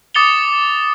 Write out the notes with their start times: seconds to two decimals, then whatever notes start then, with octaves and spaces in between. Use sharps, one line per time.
0.15 D6 D#6 A6 C#7 F7 G7